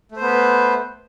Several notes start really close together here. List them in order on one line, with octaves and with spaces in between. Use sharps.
A3 C5 B3 B4